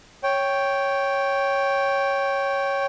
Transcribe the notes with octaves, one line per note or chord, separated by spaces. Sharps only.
C#5 G5